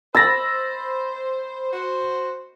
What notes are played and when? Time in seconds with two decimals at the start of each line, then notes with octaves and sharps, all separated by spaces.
0.15 C5 B5 E6 A6 A#6
1.73 F#4 C5